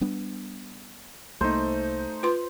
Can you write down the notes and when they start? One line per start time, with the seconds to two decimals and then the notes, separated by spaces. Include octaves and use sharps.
0.01 G3 B3 D4
1.41 C2 A3 A#3 D#4 C5
2.23 F4 B4 C6